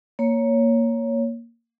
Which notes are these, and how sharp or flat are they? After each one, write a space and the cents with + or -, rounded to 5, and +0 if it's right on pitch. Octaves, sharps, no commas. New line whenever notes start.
A#3 +0 C#5 +5